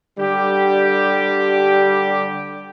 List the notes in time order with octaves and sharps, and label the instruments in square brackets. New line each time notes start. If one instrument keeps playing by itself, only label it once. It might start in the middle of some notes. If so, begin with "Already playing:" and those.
[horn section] D3 G3 G4